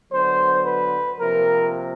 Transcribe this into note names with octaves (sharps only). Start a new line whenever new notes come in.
D3 F#3 B3 C5
B4
C3 F3 A#3 A#4